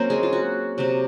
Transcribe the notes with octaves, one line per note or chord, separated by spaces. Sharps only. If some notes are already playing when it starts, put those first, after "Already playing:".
Already playing: F#3 A#3 C4 C#4 A#4 C5
G#3 G#4
F4
F#4
C3 F#3 C4